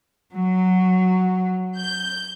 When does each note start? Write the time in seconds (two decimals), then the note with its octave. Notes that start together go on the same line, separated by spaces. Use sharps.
0.34 F#3
1.77 G6